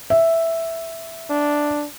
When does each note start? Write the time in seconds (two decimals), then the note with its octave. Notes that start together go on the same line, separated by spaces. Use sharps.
0.10 E5
1.30 D4